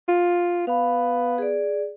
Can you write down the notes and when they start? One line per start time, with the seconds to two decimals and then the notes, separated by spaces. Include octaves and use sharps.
0.08 F4
0.67 B3 F5 B5
1.38 G#4 D5